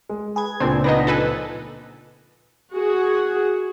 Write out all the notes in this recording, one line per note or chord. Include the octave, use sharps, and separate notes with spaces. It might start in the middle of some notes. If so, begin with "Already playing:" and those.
G#3
G#4 B4 G#6
C#2 A#2 C4 D4
B3 D4 D#4 D#5 B5 A#6
F3 A4 B4 G#5
F#4 G#4